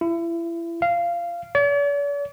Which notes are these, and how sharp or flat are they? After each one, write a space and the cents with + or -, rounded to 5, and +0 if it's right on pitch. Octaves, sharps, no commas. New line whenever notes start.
E4 +30
F5 -15
D5 -45